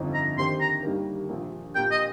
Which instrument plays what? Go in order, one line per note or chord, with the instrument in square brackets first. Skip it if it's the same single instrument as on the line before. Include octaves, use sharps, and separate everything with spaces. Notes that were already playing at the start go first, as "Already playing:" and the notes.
Already playing: [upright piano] G1 F2 F3 C4 D#4
[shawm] A#5
[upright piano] D#2 D#3 C4 G4 C5 [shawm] C6
[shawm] A#5
[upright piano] D#2 D#3 G3 A#3
A#1 A#2 F3
[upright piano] A#1 A#2 A#3 G4 A#4 [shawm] G5
[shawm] D#5